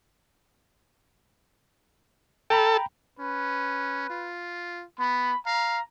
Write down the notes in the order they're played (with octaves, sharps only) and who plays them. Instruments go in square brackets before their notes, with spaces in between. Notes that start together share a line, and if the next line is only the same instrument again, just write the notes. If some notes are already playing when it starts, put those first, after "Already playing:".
[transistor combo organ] A4 [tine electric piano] G5 A#5 B5
[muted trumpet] C#4 [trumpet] B4
[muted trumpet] F4
[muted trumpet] B3 [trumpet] B5
[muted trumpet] F5 [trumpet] A#5